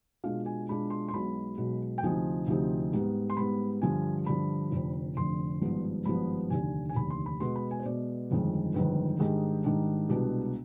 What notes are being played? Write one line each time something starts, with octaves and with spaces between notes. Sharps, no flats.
B2 G#3 D4 F4 F5
G#5
B2 G#3 D4 F4 B5
C6
C6
B1 B2 G#3 B5
B1 B2 G#3
G5
D2 C3 F3 C4 D#4 G#5
D2 C3 F3 C4 D#4
G#2 G3 B3
C6
G#2 G3 B3 B5
G2 D3 F3 G#5
G2 D3 F3 B5
F1 F2 D3
F1 F2 D3 C6
G#1 G2 F3 B3
G#1 G2 F3 B3 B5
F1 D#2 D3 G#5
G#5
F1 D#2 D3 B5
C6
B5
B2 G#3 B3 C6
B5
G#5
C5
B2 G#3 B3 D5
G1 F2 D#3 G#3
G1 F2 D#3 G#3 B4
G#2 D#3 G3 D4 G#4
G#2 D#3 G3 D4
C2 B2 G#3 B3 D4 G4